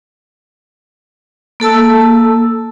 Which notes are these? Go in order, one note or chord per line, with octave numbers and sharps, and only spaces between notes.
A#3 A4 A5 E6